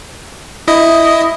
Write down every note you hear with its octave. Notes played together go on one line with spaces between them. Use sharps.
E4 D#5